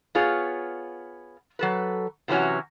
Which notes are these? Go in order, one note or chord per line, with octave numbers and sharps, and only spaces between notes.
B3 F4 G#4 C#5
F#3 A4 B4
C3 E3 F#3 C#4 F#4